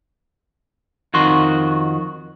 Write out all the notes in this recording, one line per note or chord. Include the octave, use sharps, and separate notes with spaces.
F2 D#3 F#4 C6